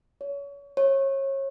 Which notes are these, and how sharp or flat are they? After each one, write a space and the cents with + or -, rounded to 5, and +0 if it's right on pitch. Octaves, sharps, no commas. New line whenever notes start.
C#5 +30
C#5 -30